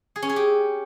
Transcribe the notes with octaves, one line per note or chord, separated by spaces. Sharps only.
G#4
C#4
G#4
G4